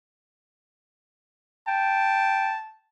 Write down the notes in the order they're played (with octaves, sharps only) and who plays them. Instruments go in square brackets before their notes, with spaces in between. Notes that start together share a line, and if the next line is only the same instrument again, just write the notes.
[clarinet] G5 [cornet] A5